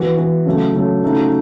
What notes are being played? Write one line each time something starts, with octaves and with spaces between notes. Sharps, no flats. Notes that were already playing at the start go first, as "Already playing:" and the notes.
Already playing: E3 B3 F#4
E3 B3 F#4
C#3 F#3 A3
C#3 F#3 A3
C#3 F#3 A3 D#4 F#4